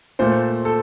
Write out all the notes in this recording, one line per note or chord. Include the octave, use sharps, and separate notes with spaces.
A#2 A3 C5
A4